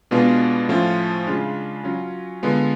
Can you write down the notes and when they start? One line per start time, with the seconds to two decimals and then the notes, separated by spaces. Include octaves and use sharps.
0.11 B2 G#3 B3 D4 F4
0.69 A2 F3 A3 C#4 F4
1.27 C#3 G#3 D4 F4
1.84 F#3 C#4 F4
2.43 D3 G#3 B3 F4